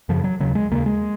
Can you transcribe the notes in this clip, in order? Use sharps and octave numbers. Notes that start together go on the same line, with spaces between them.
F#2 C#3 F3
F#3
D#2 C#3 F#3
G#3
D#2 C#3 A#3
G#3